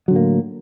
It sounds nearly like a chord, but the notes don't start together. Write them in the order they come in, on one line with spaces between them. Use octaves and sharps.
F#3 D3 A2 A#3